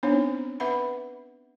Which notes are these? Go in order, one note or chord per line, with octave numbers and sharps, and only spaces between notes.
B3 C4 D4 D#4 C5 C#5
B4 E5 F#5 B5